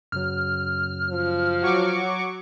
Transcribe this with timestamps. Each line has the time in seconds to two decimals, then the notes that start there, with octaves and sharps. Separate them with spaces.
0.12 F#2 C#3 F#3 F6
1.10 F3
1.62 F#3 C#6 D6